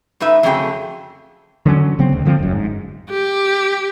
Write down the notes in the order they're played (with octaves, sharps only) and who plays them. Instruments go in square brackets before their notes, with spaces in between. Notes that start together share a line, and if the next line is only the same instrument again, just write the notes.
[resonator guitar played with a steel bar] G#2 D#4 B4 E5
F2 C#3 F#3 A3 G#4 G5
[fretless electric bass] D3 F#3 C#4
C#3 F#3 B3 C4
D2
D3 F3 A#3 C4
F#1 F#2
G#2
[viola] G4